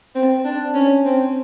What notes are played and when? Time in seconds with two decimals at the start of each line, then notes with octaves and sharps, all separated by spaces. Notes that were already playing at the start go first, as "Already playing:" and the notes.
0.15 C4
0.45 D4
0.74 C#4
1.05 C4